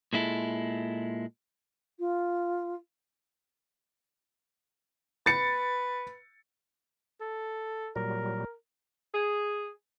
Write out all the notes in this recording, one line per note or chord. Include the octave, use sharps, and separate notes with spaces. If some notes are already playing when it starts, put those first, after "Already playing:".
A#2 G#3 E4 A4
F4
B4 A6 C#7
A4
A#2 F#3 G3 A#4
G#4